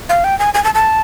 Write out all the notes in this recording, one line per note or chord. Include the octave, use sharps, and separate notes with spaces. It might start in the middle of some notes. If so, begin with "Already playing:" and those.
F5
G5
G#5
G#5
A5
A5